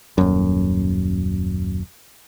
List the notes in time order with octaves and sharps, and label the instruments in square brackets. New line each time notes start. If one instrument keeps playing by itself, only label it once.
[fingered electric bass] D#1 F#2